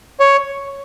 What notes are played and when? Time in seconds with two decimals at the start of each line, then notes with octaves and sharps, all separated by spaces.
0.20 C#5